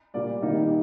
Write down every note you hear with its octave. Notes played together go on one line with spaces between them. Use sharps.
A#2 G3 A#3 D5
C3 D#3 G3 A#3 D#4
D#4